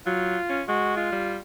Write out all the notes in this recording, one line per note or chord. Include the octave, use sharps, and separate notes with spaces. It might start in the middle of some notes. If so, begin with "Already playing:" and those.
F#3 F4
C#4
G#3 F#4
F4
G3